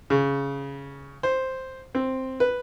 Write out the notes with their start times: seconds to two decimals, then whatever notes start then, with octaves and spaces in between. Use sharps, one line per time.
0.10 C#3
1.23 C5
1.95 C4
2.40 B4